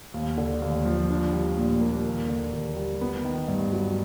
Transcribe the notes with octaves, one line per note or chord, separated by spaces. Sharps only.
D#2
D3
D#2
F3
D4
G3
A#2
A#3
D#2
D3
D#2
G3
B3
D#3
G2
F#3